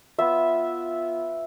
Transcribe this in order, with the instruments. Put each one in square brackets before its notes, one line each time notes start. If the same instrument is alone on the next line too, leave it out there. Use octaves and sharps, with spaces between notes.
[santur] B3 F4 E5